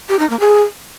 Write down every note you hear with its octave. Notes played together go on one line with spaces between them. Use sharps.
G4
D#4
A#3
G#4